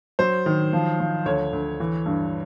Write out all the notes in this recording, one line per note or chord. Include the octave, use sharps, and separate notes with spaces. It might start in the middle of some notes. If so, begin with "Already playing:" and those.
F#3 C5
D#3
F3
F3
D2 C#5
D2
E3
G2